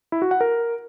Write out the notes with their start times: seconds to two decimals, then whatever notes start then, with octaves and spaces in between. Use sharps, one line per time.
0.12 E4
0.22 F#4
0.31 F#5
0.41 A#4